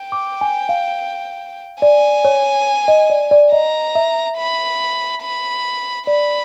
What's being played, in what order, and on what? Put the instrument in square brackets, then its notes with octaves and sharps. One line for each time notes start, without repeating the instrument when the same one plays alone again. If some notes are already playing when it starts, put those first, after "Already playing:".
Already playing: [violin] G5
[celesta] D6
G#5
F5
[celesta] D5 [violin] G#5
[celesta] C#5
D#5
D5
D5
[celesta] D#5 [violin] A#5
[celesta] E5
[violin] B5
B5
[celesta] D5 [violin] B5